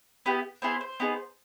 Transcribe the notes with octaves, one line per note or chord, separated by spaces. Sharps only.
B3 E4 G4
B3 E4 G#4 C5
C5
B3 D#4 G#4